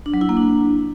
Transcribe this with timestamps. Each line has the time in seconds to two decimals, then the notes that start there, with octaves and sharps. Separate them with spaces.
0.06 D4
0.14 F#3
0.21 E4
0.29 A#3
0.37 D4